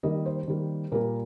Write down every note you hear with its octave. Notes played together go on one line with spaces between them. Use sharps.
D#3 G3 A#3 D#5
C5
D#3 G3 A#3
A#2 G3 A#3 A#4